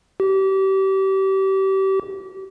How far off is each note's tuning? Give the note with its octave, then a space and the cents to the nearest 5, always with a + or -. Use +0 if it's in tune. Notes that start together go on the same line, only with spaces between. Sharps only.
G4 -30